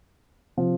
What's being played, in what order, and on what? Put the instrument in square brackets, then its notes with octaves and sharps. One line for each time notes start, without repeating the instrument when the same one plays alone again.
[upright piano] C3 F3